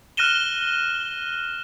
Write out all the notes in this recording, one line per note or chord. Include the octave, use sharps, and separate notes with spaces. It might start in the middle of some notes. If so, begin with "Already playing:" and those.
F6 F#6 A#6 D#7 E7 G7